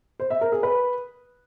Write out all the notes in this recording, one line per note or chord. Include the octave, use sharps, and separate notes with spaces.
C5
E5
A#4
G#4
B4